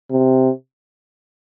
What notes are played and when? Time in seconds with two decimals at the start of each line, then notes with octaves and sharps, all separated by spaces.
0.11 C3